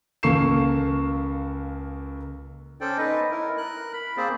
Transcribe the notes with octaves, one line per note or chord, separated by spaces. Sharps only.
C#2 A#3 A4 C#6 C7 E7
C#4 A4 C5 D5 G5
D#4 B4 D#5
E4 A#4
A#4 F#6
B5
A#3 C4 G#4 C5 D5